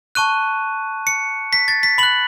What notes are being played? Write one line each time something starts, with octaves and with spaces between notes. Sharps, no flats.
A5 C#6 F#6 D#7
C#7
B6
A6
B6
B5 F#6 F#7